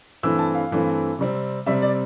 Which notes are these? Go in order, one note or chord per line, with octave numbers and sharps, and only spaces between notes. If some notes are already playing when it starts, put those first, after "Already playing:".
G2 E3 A3 C4 E6
A5
F5
G2 E3 A3 C4
C3 G3 C4
C3 G3 C4 E5
D5